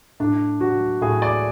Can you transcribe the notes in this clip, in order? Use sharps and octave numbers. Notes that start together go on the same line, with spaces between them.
A2 D4
F#3 F#4
A2 G#4
D5